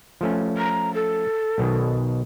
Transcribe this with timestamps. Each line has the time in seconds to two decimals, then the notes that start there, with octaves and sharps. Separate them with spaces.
0.21 F3 A3 C#4
0.58 A#5
0.94 A4
1.58 B1 B2 D#3